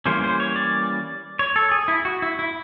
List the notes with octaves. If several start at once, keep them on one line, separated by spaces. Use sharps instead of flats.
E3 G3 A#3 C#4 C5
C5
C#5
D5
C#5
A4
G#4
E4
F#4
E4
E4